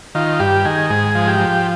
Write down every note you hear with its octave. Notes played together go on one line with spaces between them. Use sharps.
D#3 F4
G2 G4
D#3 G#4
G#2 G#4
F3
G4
F3